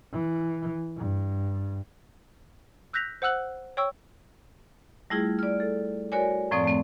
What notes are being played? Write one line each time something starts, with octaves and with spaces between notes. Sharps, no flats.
E3
G2
E6 F#6 G6 A#6 B6 F7
C5 F#5 E6 F#6 F#7
C#5 G5 C#6 E6
G3 A3 E4 F4 G#4
D5 F6
A4
F#4 A#4 C#5 D5 G#5
F#2 A2 F3 C4 D5 D#6
A3 C4